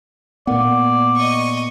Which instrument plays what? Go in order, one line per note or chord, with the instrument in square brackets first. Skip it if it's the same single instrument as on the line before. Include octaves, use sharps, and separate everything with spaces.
[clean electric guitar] A#2 A#4 F#5 [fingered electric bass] B3 [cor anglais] D5
[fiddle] D#5 C#6